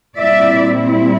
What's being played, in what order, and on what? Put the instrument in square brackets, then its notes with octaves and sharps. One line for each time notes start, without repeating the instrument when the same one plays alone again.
[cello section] A#2 G3 C4 E4 D5 E5